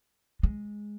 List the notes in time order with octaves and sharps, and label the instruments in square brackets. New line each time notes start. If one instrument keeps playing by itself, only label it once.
[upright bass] G#3